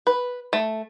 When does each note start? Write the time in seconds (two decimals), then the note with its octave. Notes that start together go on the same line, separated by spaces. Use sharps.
0.07 B4
0.53 A3